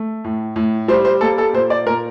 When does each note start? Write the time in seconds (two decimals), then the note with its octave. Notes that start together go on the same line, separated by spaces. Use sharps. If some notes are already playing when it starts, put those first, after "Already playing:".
Already playing: A3
0.24 A2
0.56 A2
0.88 G3 C5
1.05 C5
1.21 A#3 A4
1.38 A4
1.53 A#2 C5
1.70 D5
1.86 A#2 A#4